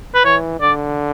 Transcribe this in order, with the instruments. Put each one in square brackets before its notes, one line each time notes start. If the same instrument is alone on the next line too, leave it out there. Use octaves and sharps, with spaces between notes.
[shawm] B4
[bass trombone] E3 [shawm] C#5
[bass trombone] D3 [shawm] D5